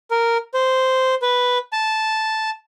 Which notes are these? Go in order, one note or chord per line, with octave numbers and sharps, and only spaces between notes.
A#4
C5
B4
A5